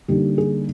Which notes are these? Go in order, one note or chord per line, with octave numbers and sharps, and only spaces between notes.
D3 G3 A#3 D#4 G4
G#4